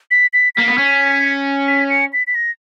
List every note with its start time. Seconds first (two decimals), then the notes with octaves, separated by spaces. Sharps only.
0.11 B6
0.33 B6
0.55 A#3 B6
0.68 B3
0.78 C#4
1.68 B6
1.90 C#7
2.13 B6
2.27 B6
2.35 A#6